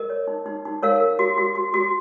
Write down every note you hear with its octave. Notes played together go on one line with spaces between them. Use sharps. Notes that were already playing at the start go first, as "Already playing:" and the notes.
Already playing: A#4 D#5
C#5
D#4
D#4
D#4
A#4 C#5 F5
A#4
F#4
F#4
F#4
F#4